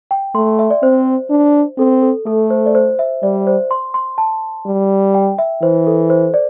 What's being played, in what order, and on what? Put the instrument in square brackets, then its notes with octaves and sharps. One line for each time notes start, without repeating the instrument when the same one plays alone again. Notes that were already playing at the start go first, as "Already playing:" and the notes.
[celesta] G5
[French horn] A3 [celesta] C6
[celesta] E5
D5
[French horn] C4 [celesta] C5
[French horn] D4
[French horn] C4 [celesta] A4
[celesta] A4
[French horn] A3 [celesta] A4
[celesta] C5
D5
C5
E5
[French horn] G3 [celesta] D5
[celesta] C5
C6
C6
A5
[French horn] G3
[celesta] G5
E5
[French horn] E3 [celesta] C5
[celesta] A4
C5
D5